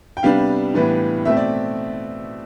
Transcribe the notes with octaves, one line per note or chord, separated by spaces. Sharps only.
G5
C3 G3 B3 D4 F5
A2 E3 G3 B3 D4
B2 A3 C4 E5
D5